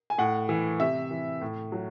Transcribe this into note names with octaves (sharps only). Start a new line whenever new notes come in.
G#5
A2 F#5
E3
C3 E5
E3
A2
F#3